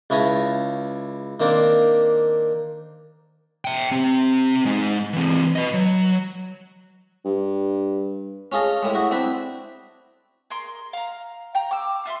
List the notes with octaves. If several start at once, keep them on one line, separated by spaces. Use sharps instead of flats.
C#2 E4 C#5 D#5 A5
D#3 A#3 C4 D4
E5 G5
C4 G4
G#3 D#4
E3 C4
B4 D#5
F#3
G2
C#4 F4 G#4 A4 D#5
A2 G3 G#3
E4 F#4 D#5
C4 D4 E4 B4
G#4 A#4 C6
F5 A#5
G5 A#5
D6 E6
F4 E5 B5 C6